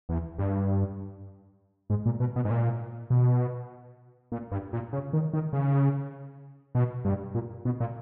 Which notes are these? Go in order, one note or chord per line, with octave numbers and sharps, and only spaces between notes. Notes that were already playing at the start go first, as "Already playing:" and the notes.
E2
G2
G#2
A#2
B2
B2
G#2
A#2
B2
A#2
G2
A#2
C#3
D#3
D#3
C#3
B2
G2
A#2
B2
A#2